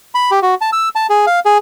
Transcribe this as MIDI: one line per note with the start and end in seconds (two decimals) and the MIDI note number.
0.15 0.31 83
0.31 0.40 67
0.42 0.55 66
0.61 0.70 81
0.72 0.89 88
0.95 1.07 81
1.10 1.26 68
1.27 1.40 77
1.45 1.58 68